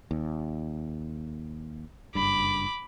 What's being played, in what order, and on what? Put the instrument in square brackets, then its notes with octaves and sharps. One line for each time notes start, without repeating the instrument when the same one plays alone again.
[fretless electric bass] D#2
[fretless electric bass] F#1 G2 [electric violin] B5 D6